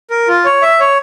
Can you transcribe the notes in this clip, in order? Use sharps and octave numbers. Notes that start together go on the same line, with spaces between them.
A#4
F4
C#5
E5
C#5